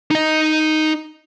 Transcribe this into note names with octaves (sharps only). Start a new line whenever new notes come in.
D#4 D#5